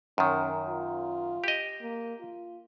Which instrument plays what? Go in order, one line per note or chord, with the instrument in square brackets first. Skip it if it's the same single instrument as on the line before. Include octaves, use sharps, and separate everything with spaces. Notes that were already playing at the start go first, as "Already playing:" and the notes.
[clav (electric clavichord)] F#2 D#3 [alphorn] C#4
[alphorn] F4
[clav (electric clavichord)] G4 D#5
[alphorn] A#3
F4